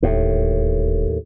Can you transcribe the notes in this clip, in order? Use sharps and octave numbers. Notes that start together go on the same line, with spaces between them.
D1 D#2 A2